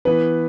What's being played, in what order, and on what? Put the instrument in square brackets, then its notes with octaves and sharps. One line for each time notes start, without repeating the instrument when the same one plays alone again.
[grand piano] E3 B3 B4